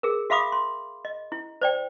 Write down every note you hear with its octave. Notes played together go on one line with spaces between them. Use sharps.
G#4 A#4
F#4 E5 F5 B5 D6 D#6
C6
D#5
E4
C5 D5 G5